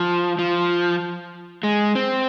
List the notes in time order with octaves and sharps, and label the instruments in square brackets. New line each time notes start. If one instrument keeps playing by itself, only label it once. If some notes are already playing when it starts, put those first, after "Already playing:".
Already playing: [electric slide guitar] F3
F3
G#3
C4